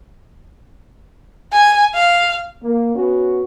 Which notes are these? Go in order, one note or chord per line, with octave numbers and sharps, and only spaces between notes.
G#5
F5
A#3
B3 C#4 F#4